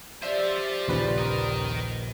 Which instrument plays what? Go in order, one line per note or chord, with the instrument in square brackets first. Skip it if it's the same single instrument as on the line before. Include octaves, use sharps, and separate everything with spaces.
[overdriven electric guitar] F4 C5 [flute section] G4 D5 [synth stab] E5
[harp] B6
[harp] A#1 C#7 [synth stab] D#2 C#3 B4
[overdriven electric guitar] A#4 D#5